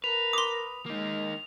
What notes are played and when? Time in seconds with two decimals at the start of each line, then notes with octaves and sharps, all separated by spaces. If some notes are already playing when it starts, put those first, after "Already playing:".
0.04 A#4 B4 F7
0.33 C6 D6 D#6
0.86 G#3 A#3 D#4